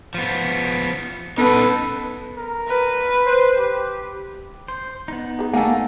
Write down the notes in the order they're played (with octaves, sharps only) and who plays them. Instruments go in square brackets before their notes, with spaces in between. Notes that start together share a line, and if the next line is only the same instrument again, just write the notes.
[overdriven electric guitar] F3 B3
[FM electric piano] B3 C#4 [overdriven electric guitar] D#4 F#5 [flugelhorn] A4 [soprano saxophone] B4
[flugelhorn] A#4
[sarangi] B4
[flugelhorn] C5
G4
[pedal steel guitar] C5
B3 D#4
[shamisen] G#4 B4
[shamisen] D3 G#5 [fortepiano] A3 A#3 [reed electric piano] F5 F#5